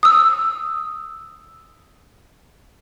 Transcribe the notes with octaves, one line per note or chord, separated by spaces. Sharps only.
D#6 E6